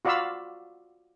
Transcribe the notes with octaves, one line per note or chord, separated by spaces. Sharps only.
F4 F#4 D5 F5 B5 E6